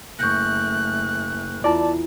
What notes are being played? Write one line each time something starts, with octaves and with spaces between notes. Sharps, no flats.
F#1 A3 C#6 F#6 G6 A#6
E2 E4 F4 D5 A5